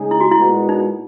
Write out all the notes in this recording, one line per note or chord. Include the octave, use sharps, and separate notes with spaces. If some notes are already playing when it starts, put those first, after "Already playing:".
Already playing: C#3 G#3 D#4 G#4
E4
F#4
E4
A#2 G#3 B3 F#4
D#4